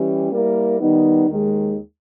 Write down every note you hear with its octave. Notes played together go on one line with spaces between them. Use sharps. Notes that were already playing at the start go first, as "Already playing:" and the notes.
Already playing: E3 G3 C#4 E4 G4
G3 A#3 E4 A#4
D#3 G3 B3 D#4
D#2 D#3 G#3